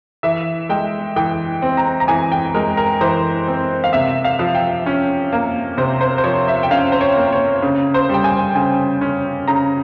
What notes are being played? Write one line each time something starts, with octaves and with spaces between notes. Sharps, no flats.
E3 E5
G#3 G5
E3 G5
C4
A#5
A#5
E3 G#5
G5
G#3 A#4
A#4
E3 C5
C4
F5
C3 E5
F5
F3
G5
C#4
A#3
C3 C5
C5
C5
F3 C#5
E5
G5
C#4 F5
C5
C#5
A#3
C#5
C#3
C5
G3 G5
G#5
C#3 G#5
C#4
C#3 A#5